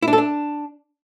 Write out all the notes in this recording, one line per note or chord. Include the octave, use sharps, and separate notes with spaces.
E4
D4
A4
D4